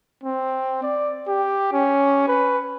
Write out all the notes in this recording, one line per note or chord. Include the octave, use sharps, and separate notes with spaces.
C4
D5
G4
C#4
B4